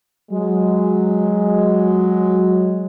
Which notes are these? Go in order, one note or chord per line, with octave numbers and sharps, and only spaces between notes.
F#3 G#3